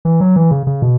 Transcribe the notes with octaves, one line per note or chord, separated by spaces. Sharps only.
E3
F#3
E3
C#3
C#3
B2